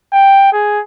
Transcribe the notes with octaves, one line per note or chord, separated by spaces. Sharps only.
G5
G#4